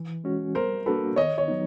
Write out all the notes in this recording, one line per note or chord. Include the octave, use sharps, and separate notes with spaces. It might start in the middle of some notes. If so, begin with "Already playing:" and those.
Already playing: E3
G#3 C#4 F#4
G3 A#4 C5
A#3 D4 F#4 A4 B4
D#3 C#5 D#5
C#5 D#5
F#3 B3 D#4